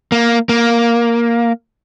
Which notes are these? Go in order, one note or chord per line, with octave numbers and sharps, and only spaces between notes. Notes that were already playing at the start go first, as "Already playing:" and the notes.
A#3
A#3